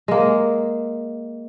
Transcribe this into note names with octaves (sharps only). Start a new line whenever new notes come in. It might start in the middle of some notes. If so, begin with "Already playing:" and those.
G#3 A#3